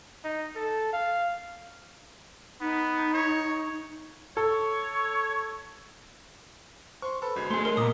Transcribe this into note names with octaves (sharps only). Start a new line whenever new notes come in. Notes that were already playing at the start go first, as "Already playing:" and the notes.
D#4
A4
F5
B3 D#4
C#5
A4 C#5
C5 C6 C#6
A4 B4 C5 B5
G1 G#3 F#4 G#6
A3 G#4 C6
G#3 A#4 C#5
A#2 B3 D#5 A#5 D6 D#6